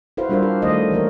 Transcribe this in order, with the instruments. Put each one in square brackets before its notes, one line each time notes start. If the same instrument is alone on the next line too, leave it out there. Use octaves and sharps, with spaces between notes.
[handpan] E4 F#4 B4 C5 F5
G3 D4 F4 A#4 C5 F5
G4
D#3 A3 C5 D#5
E3 A#3 A#4 C#5